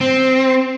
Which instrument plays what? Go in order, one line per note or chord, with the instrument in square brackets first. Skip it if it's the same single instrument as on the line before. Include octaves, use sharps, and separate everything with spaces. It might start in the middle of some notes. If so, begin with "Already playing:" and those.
[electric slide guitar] C4